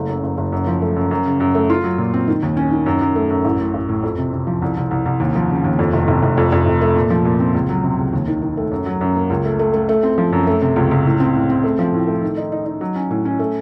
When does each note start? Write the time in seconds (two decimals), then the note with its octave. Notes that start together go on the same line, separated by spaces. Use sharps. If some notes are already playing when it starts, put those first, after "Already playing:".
Already playing: F#1 A3
0.09 F#2
0.23 F#1
0.38 F#1
0.52 F#2
0.67 F3
0.82 A3
0.96 F#2
1.11 F#2
1.26 C#3
1.40 F#2
1.55 A3
1.70 F4
1.84 F#3
1.98 A#2
2.14 C4
2.28 D#3
2.43 D#2
2.57 C#4
2.71 D#3
2.86 F#2
3.01 F#2
3.16 A3
3.30 F#2
3.45 A1
3.60 A2
3.74 A1
3.89 A2
4.03 F2
4.18 C3
4.33 C3
4.47 F3
4.62 C2
4.77 C2
4.91 C2
5.06 C2
5.20 D#2
5.35 F3
5.50 C#3
5.65 D#2
5.79 F2
5.93 F1
6.08 F1
6.23 F1
6.37 F2
6.52 F2
6.66 F1
6.81 A3
6.96 A#2
7.10 F3
7.25 A#2
7.40 C4
7.54 C#2
7.69 F#3
7.84 C3
7.98 C#2
8.13 D#2
8.27 D#3
8.42 D#3
8.57 A3
8.71 F#2
8.86 F#3
9.01 F#2
9.16 A#3
9.30 C#2
9.45 A3
9.59 A3
9.74 A3
9.89 A3
10.03 C4
10.18 F3
10.33 F#2
10.47 A3
10.62 C3
10.76 C#2
10.91 C#2
11.05 A2
11.20 C4
11.35 A2
11.50 C4
11.64 A3
11.79 F3
11.94 A2
12.07 A3
12.22 D#3
12.37 D#4
12.52 D#4
12.66 D#4
12.81 F#3
12.96 C#4
13.11 A2
13.25 C#4
13.39 A3